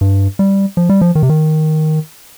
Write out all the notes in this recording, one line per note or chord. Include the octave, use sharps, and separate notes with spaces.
G2
G3
F3
G3
F3
D#3
C3
D#3